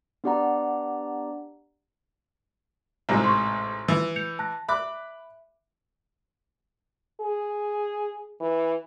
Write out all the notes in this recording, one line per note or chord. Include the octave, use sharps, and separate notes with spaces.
B3 D4 G4 D5 F#5 A#5
A1 G#2 C3 A#5
C6 C#6
E3
G6 C#7 F7
A5 F#6 A#6
E5 B5 D6 F#6
G#4
E3